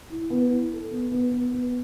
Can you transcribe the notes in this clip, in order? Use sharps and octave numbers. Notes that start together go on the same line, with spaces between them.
E4
B3
E4
A4
B3
B3
B3
B3